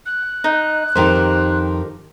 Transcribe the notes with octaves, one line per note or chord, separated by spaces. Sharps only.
F#6
D#4
F2 D#3 D#4 G4 A#4 C5